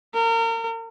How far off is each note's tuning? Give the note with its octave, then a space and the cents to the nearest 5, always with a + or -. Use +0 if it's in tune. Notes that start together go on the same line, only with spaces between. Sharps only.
A#4 -35